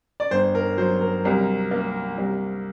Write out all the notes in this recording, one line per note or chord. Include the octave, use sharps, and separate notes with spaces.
D5
G1 C5
A#4
F#3 C5
A#4
C2 A#4
A#3
C2